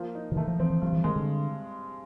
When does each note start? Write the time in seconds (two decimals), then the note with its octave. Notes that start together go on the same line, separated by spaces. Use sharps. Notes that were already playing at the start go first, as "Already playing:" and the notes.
Already playing: F3 A#3
0.15 D#4
0.32 D3
0.36 D#3 A3
0.48 F3
0.60 E3 C4
0.70 E3
0.82 G2 F3
0.93 E3
1.04 D#3 G#3
1.16 D3